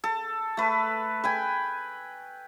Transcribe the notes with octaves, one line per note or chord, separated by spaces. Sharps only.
A4
A3 B4
B4 G5 G#5